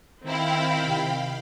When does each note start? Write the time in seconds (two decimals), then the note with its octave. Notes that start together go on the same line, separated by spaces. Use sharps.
0.25 D#3 C4 E4 F5 G5 B5
0.84 C3